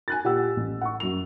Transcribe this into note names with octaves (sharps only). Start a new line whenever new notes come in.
G#5 F#6 A6
A#2 G4 F#5 E6
A1
F#5 C#6
F#2 F7